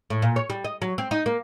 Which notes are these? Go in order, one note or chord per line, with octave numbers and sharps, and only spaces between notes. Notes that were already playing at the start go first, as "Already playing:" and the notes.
A2
A#2
C#5
G3
D#5
F#3
C4
D#4
A#3